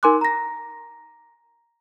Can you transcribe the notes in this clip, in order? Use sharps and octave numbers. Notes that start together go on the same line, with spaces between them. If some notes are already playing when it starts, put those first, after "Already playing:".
D#4 A#4 G#5 C6 D6 F#6
A#5 A#6